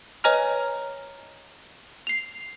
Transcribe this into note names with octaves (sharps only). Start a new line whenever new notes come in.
B4 C#5 D#5 G#5 A#5 F6
C7 F7